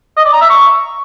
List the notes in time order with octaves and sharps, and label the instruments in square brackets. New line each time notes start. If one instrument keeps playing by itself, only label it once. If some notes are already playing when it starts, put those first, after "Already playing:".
[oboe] D#5
D5
A#5
E5
C#6